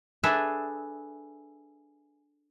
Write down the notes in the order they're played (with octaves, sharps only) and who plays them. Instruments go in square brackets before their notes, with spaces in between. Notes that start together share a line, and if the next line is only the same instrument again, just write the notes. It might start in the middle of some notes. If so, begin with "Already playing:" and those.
[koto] D4 G#4 A4 B4 E5